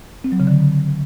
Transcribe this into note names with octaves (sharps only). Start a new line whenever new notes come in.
C4
F#3
C#3
D3